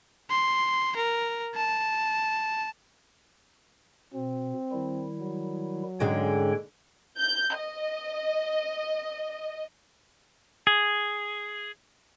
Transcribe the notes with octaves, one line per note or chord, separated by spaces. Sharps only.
C6
A#4
A5
B2 C4
D#3 G3 E4
F#3
G#2 D3 G#3 C#4 C#5 G5
G6
D#5
G#4